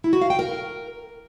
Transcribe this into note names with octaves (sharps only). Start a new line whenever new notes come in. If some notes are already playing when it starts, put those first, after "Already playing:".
E4
F#4
F5
G5
A#4